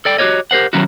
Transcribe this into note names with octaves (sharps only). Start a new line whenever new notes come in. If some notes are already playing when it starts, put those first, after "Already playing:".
A4 D5 G5
F#4 G4 A#4 C#5 D#5
G4 A#4 C5 F#5
D#3 F#3 C#4 E4 F#4